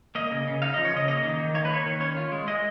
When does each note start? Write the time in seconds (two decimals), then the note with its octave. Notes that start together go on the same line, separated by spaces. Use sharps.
0.15 A#3 D#5
0.31 C#3
0.47 C#3
0.62 D#4 F5
0.74 D#5
0.77 F3
0.85 C#5
0.93 C#3 D#5
1.08 A#3 D#5
1.23 D#3
1.39 D#3
1.55 A#3 C#5
1.65 B4
1.69 A#3 C#5
1.86 D#3
2.00 C#4 C#5
2.17 F4
2.32 G#3
2.48 G#3 D#5